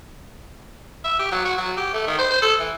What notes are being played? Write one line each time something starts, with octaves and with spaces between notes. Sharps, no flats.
E5
G4
F#3
F#4
F#3
G4
A3
D#3
C5
C5
A4
E3